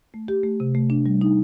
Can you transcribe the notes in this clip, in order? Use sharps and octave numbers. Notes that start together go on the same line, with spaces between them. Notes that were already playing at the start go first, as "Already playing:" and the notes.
A3
G4
A3
C3
A3
D4
G3
D#4